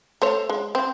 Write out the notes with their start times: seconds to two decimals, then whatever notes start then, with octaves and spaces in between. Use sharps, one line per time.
0.22 A3 C5 C#5
0.49 G#3
0.75 C4